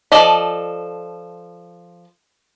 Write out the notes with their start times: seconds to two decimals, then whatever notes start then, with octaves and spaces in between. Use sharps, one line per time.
0.12 F3 A4 D5 D#5